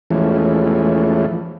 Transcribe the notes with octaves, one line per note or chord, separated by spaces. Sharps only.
E2 E3 F3 G#3 A3 C#4